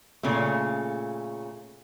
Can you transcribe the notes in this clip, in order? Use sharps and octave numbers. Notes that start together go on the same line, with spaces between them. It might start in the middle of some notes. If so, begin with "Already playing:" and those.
A#2 C#3 A3